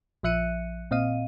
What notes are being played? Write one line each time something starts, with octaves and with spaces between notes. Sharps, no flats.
A#1 F3 E5 F#6 C#7 D#7
A#2 C4 D#5 F5 D#7